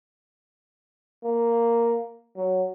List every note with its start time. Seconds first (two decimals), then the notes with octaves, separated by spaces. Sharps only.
1.24 A#3
2.36 F#3